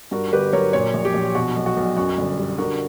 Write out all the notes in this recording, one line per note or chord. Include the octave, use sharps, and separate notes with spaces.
G2 F#4 A#4
G1 G4 B4
F#3 A#4 C#5
A#2 A#4 C#5
A#1
G4
A#1
B2 F#4
B1
F#4
B1
F#2 F#4
G1
G3
D3 F#4 A#4